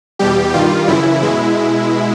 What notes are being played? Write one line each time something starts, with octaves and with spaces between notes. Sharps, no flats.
E2 B2 G3 G4
G2 D#3 G3 F4
F#2 C#3 E3 E4
B2 G#3 E4